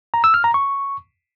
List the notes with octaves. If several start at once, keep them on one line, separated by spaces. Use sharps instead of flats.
A#5
E6
F6
A#5
C#6